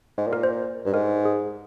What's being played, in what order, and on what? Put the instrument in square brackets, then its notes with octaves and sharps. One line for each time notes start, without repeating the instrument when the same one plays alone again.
[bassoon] G#2
A#2
[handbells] A#4
C5
[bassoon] G2
[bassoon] G#2 [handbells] A#4
[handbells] G#4